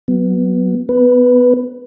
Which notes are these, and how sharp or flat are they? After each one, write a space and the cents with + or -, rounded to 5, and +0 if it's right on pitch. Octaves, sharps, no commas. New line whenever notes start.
F#3 +0 B3 +0
B3 +20 B4 +0